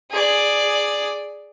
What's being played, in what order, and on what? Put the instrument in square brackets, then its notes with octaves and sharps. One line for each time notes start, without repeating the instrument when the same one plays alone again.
[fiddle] G#4 D5